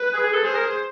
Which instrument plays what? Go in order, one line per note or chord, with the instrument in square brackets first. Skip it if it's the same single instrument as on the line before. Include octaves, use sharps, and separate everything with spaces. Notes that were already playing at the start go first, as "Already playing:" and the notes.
Already playing: [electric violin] B4
[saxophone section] G#4
G#4
A4
[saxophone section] G#4 [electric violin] C5
[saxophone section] A#4
G#4